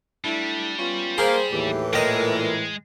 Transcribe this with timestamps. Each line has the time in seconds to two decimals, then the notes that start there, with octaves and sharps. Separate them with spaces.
0.25 G3 A3 D4 E4
0.79 B3 C#4 F4
1.18 A#3 G#4 C5
1.52 D#2 A2 E3 G4
1.93 A#2 G#3 A#4 D#5 G5